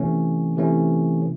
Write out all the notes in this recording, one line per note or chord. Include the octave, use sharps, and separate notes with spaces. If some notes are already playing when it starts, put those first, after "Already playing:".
Already playing: C3 E3 A3 C#4
C3 E3 A3 C#4